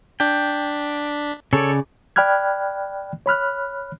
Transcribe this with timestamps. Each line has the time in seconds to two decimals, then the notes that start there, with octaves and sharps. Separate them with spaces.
0.20 D4 G5 B6
1.53 C#3 A4 C#5 D5
2.16 D5 G5 B5 F6 F#6 G#6
3.26 C#5 B5 F6 F#6